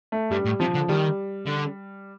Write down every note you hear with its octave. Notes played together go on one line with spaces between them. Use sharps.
A3
G2 G3
A2
C3 F3
D3
D#3 G3
D3